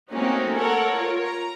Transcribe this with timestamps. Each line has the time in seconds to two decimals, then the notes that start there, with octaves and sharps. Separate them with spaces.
0.10 A3 A#3 C4 C#4 D#4 F#4
0.55 A4 A#4 C#5 F#5
0.96 F4 A#4 C#5
1.25 A#5